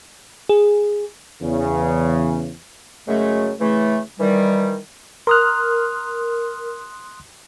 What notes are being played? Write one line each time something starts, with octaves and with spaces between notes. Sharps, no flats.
G#4
E2 C#3
F#2 C#3 F#3 G#3 A3
C#3 E3 A3
D#3 E3 G3
A#4 C6 D#6 F6 F#6